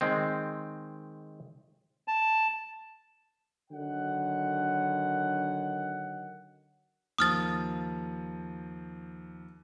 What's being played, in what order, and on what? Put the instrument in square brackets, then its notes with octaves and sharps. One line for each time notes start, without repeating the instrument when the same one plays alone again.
[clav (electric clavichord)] D#3 G#3 C4
[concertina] A5
[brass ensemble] D3 D#3 F#3 F#5
[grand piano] D#2 F3 [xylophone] D#6 F6 A6